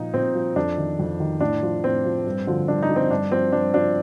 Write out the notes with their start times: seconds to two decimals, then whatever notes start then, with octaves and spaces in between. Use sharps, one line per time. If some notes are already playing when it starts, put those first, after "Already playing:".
Already playing: A#2 F3 D#4
0.14 A#2 C4
0.35 F3
0.56 F2 D4
0.77 D#3
0.99 F2
1.20 D#3
1.40 A2 D4
1.63 F3
1.84 A2 C4
2.05 F3
2.26 G2
2.47 D3 F3
2.68 G2 D4
2.82 D#4
2.89 D3 F3
2.96 C4
3.11 G2 D4
3.31 F3 C4
3.52 G2 D4
3.74 F3 D4